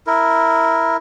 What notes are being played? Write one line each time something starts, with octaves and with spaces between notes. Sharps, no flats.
E4 A#4